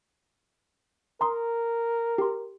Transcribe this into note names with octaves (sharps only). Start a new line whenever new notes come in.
A#4 A#5 C6 D#6
G4 C6